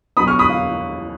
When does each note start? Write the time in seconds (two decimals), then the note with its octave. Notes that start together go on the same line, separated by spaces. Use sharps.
0.17 B2 F#3 B3 B5 D#6
0.27 C#6 F6
0.39 B5 D#6
0.49 F5